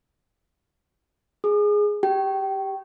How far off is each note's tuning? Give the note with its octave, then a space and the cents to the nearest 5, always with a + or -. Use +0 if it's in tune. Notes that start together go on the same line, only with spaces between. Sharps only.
G#4 +0 D#6 -45
G4 +0 G5 -25